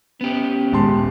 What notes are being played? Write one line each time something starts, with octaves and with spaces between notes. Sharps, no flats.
B3 C#4 G4
D#1 G#3 A5 C6